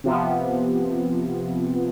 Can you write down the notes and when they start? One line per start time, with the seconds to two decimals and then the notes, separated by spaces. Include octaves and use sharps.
0.04 C3 F3 B3